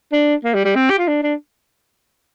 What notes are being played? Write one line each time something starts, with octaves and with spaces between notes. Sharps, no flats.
D4
A#3
G3
G3
C4
G4
F4
D4
D4